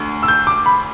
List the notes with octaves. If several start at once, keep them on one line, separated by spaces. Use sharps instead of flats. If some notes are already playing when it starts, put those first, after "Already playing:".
Already playing: D2 D3
E6
G6
D6
B5